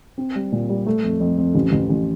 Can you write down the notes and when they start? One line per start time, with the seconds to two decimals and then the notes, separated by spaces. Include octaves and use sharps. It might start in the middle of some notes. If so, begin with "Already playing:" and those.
0.18 C4
0.35 G3
0.52 A#2
0.69 G3
0.87 A3
1.04 F2
1.20 F2
1.38 F2
1.55 A1
1.72 A1
1.89 A1